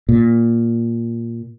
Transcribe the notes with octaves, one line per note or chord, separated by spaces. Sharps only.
A#2